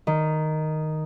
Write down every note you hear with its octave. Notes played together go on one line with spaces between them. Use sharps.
D#3